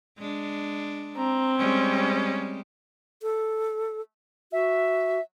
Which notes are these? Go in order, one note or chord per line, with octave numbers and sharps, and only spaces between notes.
G#3 D4
C4 A#5
G3 G#3 C#4
A4
F#4 E5